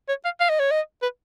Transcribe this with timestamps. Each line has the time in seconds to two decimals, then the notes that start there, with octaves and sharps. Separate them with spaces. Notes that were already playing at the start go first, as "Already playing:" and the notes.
0.09 C#5
0.24 F5
0.40 F5
0.50 D#5
0.59 C#5
0.71 D#5
1.02 B4